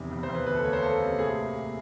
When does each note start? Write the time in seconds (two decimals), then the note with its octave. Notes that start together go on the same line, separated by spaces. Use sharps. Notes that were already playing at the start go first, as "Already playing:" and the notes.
Already playing: E2 C3 D#3
0.11 E2
0.23 C5
0.29 E2
0.34 B4
0.46 D2 B4
0.55 A4
0.65 A#3 C#5
0.73 C5
0.82 A#3 A4
1.01 C3
1.18 A2 G#4
1.36 A#3
1.54 A#3